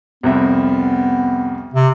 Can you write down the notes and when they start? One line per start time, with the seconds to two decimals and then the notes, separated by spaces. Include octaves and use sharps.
0.23 C2 F2 B3 E5
1.74 C3